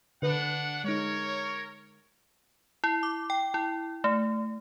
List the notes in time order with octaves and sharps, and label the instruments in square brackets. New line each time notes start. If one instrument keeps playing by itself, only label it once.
[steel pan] D3 B4 [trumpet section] D4 F#5
[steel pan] G#3 D#4 [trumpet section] A#4 C#5
[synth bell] E4
D6
G5
E4
A3